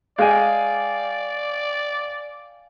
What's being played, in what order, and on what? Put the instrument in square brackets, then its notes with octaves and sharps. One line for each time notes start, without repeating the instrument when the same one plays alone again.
[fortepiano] G#3 [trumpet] D5 [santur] F5 G5 G#5